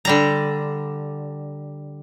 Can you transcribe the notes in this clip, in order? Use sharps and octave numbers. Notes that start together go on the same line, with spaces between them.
D3 G3 A#5